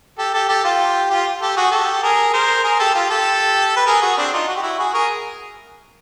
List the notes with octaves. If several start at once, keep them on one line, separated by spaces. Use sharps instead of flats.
G4 A4
G4 A4
G4 A4
F4 G4
F4 G4
G4 A4
F#4 G#4
G4 A4
G#4 A#4
A#4 C5
G#4 A#4
G4 A4
F4 G4
G4 A4
B4
G#4 A#4
F#4 G#4
C4 D4
D#4 F4
F#4
G4
E4 F#4
F#4 G#4
G#4 A#4